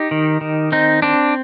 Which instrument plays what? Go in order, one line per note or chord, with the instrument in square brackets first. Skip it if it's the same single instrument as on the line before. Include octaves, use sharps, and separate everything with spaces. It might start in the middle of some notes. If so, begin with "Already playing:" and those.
Already playing: [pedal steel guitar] D#4 G4
D#3
D#3
C4 D#4
C4 D4